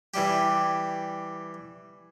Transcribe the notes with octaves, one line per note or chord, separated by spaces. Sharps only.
E3 G3 G4